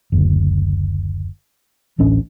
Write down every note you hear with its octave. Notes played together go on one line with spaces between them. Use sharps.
F#1 D2
D1 A1 C#4 D4